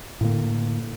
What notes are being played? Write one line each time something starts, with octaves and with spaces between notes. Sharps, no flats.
A2 D3 A#3